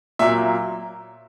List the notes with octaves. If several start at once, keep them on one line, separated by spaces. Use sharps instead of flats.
A#2 F#3 A#3 E5